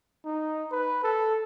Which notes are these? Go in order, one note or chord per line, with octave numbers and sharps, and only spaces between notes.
D#4
B4
A4